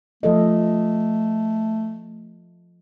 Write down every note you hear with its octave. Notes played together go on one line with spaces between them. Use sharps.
F3 A3 A4 D#5